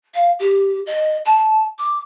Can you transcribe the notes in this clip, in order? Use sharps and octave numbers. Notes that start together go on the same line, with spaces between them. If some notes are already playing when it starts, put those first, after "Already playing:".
F5
G4
D#5
A5
D6